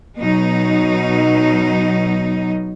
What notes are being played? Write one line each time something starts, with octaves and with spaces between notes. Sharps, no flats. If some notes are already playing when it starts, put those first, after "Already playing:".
B2 F#3 D#4